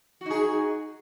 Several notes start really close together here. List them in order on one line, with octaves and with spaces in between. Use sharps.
F#4 D#4 G#4